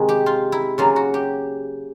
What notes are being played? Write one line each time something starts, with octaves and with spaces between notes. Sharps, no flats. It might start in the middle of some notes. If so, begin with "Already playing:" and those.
Already playing: C3 D#3 G#3
G4
F4
E4
C#3 F#3 A#3 F4
F#4
G4